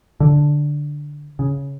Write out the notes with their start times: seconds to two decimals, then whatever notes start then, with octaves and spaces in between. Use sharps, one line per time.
0.20 D3
1.39 C#3